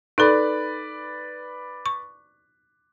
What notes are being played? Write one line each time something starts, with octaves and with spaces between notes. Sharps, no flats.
D#4 A4 B4 D5 B5
C#6